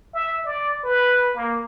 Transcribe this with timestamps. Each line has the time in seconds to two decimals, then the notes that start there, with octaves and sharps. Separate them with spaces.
0.14 E5
0.45 D5
0.84 B4
1.35 A#3